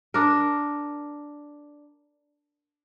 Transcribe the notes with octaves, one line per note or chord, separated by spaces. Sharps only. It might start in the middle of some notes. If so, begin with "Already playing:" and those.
D4 A#4